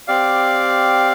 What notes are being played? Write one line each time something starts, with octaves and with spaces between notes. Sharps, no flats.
C4 G4 D5 F5